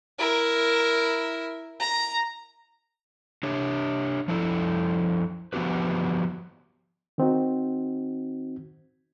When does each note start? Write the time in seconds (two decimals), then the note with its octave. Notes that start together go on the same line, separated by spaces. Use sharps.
0.19 E4 A#4
1.79 A#5
3.43 D4 G4 C#5
4.28 F3 E4 A4
5.53 F3 B3 F#4 G4 B4
7.18 D#3 C4 D#4 F#4